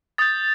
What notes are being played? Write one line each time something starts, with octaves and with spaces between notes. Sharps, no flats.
D#6 G6 A6